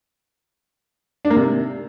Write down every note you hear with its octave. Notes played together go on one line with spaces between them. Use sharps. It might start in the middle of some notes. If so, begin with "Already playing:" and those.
D4
A#3
C3